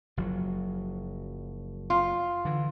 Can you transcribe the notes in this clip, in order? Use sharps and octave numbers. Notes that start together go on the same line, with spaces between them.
F#1 F3 F#3
F4
D3 E3